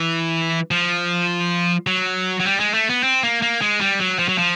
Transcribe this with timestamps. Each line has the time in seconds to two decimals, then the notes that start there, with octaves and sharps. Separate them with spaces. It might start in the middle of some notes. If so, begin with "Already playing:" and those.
Already playing: E3
0.71 F3
1.87 F#3
2.40 F#3
2.45 G3
2.60 G#3
2.74 A3
2.89 B3
3.03 C4
3.23 A#3
3.42 A#3
3.61 G#3
3.81 G3
4.00 F#3
4.19 F3
4.29 F#3
4.38 F3